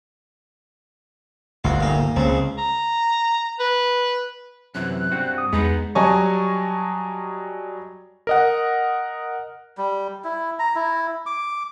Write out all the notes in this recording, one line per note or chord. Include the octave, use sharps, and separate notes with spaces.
G1 D2 F4 F#4
A#2 D#4
C#2 C#3 C4
A#5
B4
F#2 C3 E3 F#6
G2 C4 F#4
D#6
E2 G#3 B3 D#4 G#4 B4
F#3 G3 D#5 G#5 A5 C#6
A#4 D#5 F#5
G3
E4
A#5
E4
D6